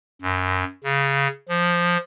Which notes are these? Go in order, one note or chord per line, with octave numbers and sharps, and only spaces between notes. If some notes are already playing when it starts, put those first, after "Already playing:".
F#2
C#3
F3